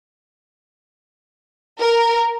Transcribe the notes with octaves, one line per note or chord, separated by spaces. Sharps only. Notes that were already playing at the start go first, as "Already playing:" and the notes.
A#4